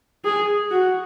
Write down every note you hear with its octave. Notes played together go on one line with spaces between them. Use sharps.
G#4
F#4